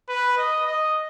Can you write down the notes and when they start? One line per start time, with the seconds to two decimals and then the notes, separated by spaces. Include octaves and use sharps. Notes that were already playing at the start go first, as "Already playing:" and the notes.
0.09 B4
0.38 D#5
0.67 D#5